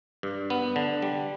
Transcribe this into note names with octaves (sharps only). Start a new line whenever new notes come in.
G2
B3
D3
G3